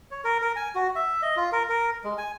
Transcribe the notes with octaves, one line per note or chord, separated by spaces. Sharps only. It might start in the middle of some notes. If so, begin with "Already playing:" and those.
C#5
A#4
A#4
G#5
F#4
E5
D#5
F4
A#4
A#4
G#3
G#5